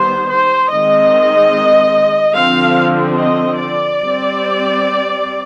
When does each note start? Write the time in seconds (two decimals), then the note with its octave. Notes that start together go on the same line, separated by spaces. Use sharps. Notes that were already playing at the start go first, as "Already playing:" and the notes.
Already playing: D#3 G3 B3 C5
0.30 C5
0.71 D#3 G#3 C4 D#5
2.35 D3 F3 C4 F5
3.19 D#5
3.60 D5
4.01 G3 C4